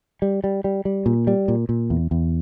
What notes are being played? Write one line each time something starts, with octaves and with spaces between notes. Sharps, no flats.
G3
G3
G3
G3
A#2
G3
A#2
A#2
E2
E2